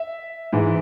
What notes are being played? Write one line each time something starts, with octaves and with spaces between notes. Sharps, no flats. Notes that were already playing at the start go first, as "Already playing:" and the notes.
Already playing: E5
G#2 E3